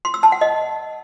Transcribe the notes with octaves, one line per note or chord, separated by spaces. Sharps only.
C6
E6
A5
F#5
D#5